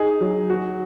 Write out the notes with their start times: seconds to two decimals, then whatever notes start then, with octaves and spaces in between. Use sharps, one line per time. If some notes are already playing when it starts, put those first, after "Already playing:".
Already playing: D#4 G#4
0.21 F#3
0.50 F#4